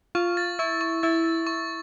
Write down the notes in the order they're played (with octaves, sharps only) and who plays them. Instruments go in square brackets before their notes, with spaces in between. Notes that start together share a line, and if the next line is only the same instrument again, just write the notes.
[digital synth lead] F4 [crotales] C#6
[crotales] A6
[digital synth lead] E4 [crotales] C#6
[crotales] C#6
[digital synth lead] E4 [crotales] A6
[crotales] A6
C#6